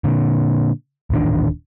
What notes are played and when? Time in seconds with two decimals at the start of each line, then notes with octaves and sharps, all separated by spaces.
0.04 A#2 D3
1.10 D#1 A1 D#3 D4